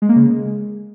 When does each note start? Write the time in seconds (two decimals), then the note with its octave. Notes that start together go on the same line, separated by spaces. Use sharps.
0.02 G#3
0.09 A#3
0.16 C#3
0.23 G#3